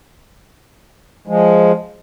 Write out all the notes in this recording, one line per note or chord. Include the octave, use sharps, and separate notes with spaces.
F3 G#3